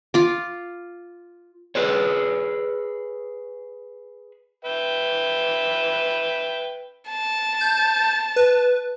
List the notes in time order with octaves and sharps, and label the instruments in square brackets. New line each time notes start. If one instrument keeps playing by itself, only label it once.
[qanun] F4 D6
[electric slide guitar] G#4 B4 C#5
[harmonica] B4 E5 G5
[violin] A5
[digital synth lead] G6
B4